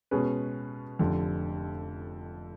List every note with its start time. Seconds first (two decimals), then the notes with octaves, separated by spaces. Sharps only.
0.11 B2 G#3 C#4 G#4 B4
0.99 F1 F2 D3